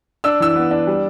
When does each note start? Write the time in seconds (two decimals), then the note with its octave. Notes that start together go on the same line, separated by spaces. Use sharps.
0.24 D4 E6
0.40 E3 E6
0.56 B3
0.71 D4
0.87 G3